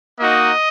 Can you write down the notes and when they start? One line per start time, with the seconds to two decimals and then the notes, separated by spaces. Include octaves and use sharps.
0.19 A#3 D#4 F#4 D#5